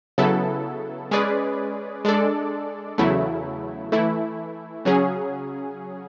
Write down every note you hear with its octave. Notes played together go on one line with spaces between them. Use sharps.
C#3 F#3 B3 E4 A4
G#3 C#4 G#4 B4 D5
G#3 D4 A4 D5
E2 C#3 F#3 A3 E4
E3 A3 E4
C#3 F#3 C#4 G#4